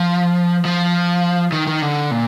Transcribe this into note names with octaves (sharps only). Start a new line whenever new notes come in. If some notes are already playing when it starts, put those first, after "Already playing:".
Already playing: F3
F3
D#3
D#3
D3
A#2